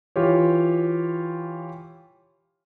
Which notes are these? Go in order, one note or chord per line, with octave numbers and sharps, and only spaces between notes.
E3 F4 G4 C#5